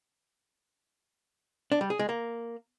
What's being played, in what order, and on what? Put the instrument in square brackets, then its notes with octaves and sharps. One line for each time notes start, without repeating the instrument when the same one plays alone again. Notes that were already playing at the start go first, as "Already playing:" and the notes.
[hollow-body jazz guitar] D4
G3
G#4
G#3
A#3